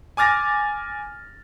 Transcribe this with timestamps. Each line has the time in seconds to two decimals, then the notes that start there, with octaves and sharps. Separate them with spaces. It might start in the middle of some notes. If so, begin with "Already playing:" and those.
0.17 G#5 D6 F6 A6 A#6